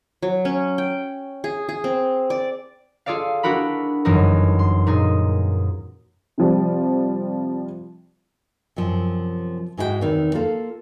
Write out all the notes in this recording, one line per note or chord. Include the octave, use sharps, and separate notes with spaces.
F#3
C#4
G5
G#4
G#4
C4
D5
F4 G#4 A4 D5 F5
D4 E4 F#4 A#4 B5
G1 F#2 E3 D#4 A#4
C6
A#2 D#4 G#4
C3 F3 G3
F#2 C3 F3
G#2 G#3 E4 F#4 A#4 G5
E2 C3 D#3
A#3 F4 A4 F5